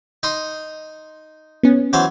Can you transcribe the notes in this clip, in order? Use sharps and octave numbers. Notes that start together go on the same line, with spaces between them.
D#4 C6 D#6
B3 C#4
E3 F#3 C5